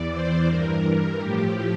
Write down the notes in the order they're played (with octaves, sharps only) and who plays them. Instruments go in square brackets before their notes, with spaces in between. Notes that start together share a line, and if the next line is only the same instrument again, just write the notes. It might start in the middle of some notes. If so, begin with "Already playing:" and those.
Already playing: [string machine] E2 E3 D5
C5
G2 E3 A#4
A2 F3 G4